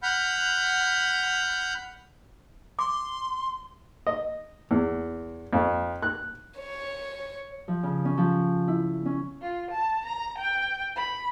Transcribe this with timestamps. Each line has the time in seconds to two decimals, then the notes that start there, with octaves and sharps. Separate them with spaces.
0.03 F#5 B5 F6 G6
2.79 C6 D6
4.07 D#5
4.71 E2
5.53 F2
6.03 F#6
6.59 C#5
7.68 F3
7.83 C#3
8.05 C#4
8.18 F3
8.68 E4
9.05 C#4
9.42 F4
9.71 A5
10.05 A#5
10.38 G5
10.96 B5